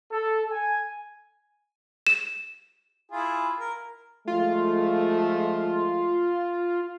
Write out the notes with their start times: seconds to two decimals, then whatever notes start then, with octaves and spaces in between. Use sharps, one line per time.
0.11 A4
0.51 G#5
2.07 E7
3.12 E4 F4 G#4
3.60 A#4
4.27 F3 G#3 A3 F4